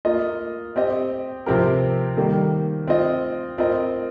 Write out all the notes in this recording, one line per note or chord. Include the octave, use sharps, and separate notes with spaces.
A#3 F4 D#5
C4 G4 D#5
C3 F3 C4 G4 A#4
D#3 G3 A#3
C4 F4 D#5
C4 F4 A#4 D#5